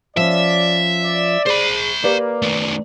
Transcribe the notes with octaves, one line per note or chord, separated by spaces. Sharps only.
F3 C#4 D5 E5
D5
G#4 C5 B5
A#3 G4 B4 D5
D#3 A3